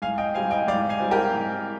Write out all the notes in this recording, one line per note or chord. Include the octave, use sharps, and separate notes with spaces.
G#2 F5 G#5
D#5 G5
G3 C4 F5 G#5
D#5 G5
G#2 D5 F5
F5 G#5
G3 C4
G4 A#4
G#2